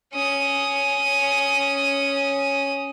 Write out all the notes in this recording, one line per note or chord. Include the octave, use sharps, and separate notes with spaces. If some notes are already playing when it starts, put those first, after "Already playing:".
C#4 D#6